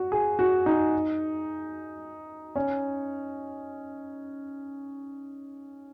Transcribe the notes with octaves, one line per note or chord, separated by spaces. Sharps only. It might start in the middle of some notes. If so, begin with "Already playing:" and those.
Already playing: F#4
G#4
F#4
D#4
C#4